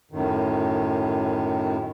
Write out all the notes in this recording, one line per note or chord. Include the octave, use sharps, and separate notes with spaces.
F#2 A2 D#3